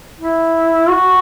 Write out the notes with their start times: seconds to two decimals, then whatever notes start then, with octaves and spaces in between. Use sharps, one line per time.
0.20 E4
0.89 F#4